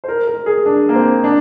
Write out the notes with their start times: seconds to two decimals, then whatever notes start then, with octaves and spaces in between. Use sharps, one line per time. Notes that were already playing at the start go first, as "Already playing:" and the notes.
0.04 C5
0.08 A#4
0.27 A#4
0.46 G#4
0.66 D4
0.89 A#3
0.95 C4
1.24 D4